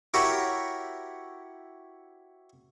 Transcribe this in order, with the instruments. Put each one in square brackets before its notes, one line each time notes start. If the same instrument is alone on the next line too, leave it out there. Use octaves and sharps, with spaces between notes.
[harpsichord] E4 F#4 G4 A#4 C#5